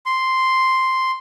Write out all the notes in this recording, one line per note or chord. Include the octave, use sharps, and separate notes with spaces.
C6